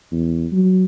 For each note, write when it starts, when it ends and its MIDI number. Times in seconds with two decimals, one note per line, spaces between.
0.12 0.47 40
0.52 0.85 54